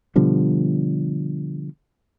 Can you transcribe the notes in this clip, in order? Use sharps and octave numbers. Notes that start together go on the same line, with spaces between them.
B2 D3 F3 G3